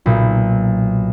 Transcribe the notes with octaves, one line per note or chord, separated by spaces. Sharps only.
B1 A#2